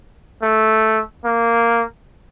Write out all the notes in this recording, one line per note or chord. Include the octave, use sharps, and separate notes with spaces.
A3
A#3